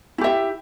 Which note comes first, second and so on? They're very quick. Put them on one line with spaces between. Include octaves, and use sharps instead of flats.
E4 G4 E5